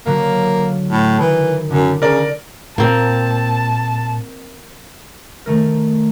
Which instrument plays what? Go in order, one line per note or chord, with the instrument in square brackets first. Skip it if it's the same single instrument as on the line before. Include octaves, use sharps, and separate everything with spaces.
[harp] D3 F#3 [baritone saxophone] A#3
[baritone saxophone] A2
[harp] D#3 [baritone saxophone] E3
[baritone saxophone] F#2 [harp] D3
[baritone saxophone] C#3 [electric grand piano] A#4 D5
[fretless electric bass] A#2 [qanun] A#3 C4 [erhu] A5
[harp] D#3 A3 A#4